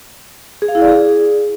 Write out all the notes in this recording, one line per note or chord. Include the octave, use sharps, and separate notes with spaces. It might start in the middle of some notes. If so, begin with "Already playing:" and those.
G#4
F5
E4
D5
G#4